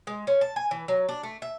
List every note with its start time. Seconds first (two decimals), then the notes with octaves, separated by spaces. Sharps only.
0.07 G#3
0.27 C#4
0.41 A5
0.56 G#5
0.71 E3
0.88 F#3
1.09 D4
1.23 A3
1.42 E5